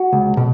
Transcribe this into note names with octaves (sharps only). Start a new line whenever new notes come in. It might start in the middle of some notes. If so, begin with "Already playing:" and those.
Already playing: F#4
C#2
B2